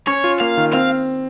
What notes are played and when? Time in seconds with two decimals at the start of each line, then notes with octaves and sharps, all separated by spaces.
0.07 C#4 C#5
0.24 F4
0.40 A#3 F5
0.57 D#3
0.73 C4 F5